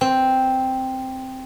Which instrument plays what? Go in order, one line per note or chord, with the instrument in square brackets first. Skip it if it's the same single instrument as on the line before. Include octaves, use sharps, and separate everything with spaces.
[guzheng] C4